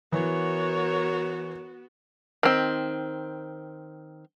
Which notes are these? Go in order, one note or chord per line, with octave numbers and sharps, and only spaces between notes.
E3 B3 F#4 A#4 C#5
D#3 C4